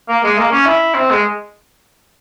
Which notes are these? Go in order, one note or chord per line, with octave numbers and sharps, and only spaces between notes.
A#3
G#3
A#3
C#4
E4
C4
G#3